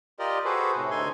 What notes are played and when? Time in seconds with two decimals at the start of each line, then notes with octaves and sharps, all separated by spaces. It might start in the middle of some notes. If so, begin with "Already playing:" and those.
0.19 F4 G4 A#4 D5 D#5
0.45 F#4 G#4 A4 B4 C5
0.76 A2 C3
0.91 D2 D#4 A4 G#5 C6